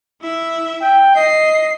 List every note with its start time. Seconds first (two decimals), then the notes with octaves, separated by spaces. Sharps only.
0.22 E4 E5
0.82 G5
1.16 D#5 C7